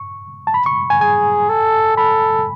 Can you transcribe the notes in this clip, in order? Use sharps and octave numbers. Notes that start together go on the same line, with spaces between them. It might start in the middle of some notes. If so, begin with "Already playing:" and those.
Already playing: C#6
A5
B5
C#6
G#5
G#4 G#5
A4
A4 B5